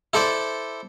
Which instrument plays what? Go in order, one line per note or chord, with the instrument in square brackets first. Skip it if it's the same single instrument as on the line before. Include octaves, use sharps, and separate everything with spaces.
[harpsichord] E4 A4 C5 D5